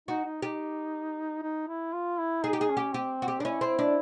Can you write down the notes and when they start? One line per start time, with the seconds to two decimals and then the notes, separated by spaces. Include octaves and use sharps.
0.08 D#4 F#4
0.25 D#4
0.42 D#4 G4
1.43 D#4
1.68 E4
1.93 F4
2.19 E4
2.44 D#4 G#4
2.53 G4
2.61 G#4
2.69 C#4
2.77 G4
2.93 C4 G4
3.22 F#4
3.28 G4
3.40 D4
3.44 C#4 E4
3.61 C4
3.79 D4